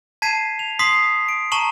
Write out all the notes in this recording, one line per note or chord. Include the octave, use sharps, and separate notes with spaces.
A5 G#6 B6 C7 D#7 E7
F7
C6 D#6 B6 C7
D7
A5 A#5 C#6 E7 F#7